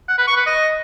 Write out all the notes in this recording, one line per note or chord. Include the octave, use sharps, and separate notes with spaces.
F#5
B4
C#6
B4
D#5